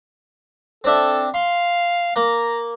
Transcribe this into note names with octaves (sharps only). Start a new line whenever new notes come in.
C4 D4 A4 E5
F5 C6
A#3 A#5